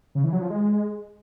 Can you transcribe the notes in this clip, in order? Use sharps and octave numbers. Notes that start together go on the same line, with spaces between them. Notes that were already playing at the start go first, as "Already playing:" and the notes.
C#3
E3
F#3
F3
G#3